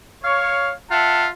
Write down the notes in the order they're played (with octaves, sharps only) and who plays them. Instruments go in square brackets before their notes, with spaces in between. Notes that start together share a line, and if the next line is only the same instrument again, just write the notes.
[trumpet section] C#5 [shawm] F5
[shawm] F4 [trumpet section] E5 F#5 A5